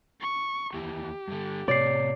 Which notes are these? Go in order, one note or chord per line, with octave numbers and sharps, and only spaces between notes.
C#6
D#2 E3 G4
G2 D3
A2 C3 C#5 D5 C7